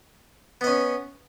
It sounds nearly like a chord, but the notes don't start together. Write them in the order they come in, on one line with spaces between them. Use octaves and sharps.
B3 D#5 C#4